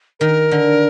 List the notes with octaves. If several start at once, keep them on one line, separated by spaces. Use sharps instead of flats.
D#3 A#4
D3